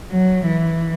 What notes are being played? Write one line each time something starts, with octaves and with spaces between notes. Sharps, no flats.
F#3
E3